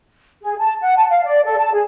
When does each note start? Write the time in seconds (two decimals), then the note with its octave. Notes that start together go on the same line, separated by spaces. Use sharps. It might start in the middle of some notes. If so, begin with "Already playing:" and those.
0.42 G#4
0.59 A5
0.81 F#5
0.97 A5
1.10 F5
1.25 D5
1.44 A4
1.59 A5
1.73 G#4